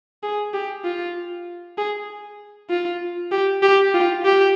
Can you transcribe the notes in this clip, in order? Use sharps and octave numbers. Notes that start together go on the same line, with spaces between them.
G#4
G4
F4
G#4
F4
G4
G4
F4
G4